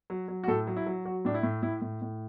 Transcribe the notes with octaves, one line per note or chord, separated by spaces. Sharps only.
F#3
F#3
F#4
A2 A4
F#3
E4
F#3
F#3 F#4
A2 D4
E4
A2
A2 E4
A2
A2